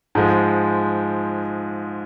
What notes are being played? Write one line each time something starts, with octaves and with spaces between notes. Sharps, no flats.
G#2 F3 G#3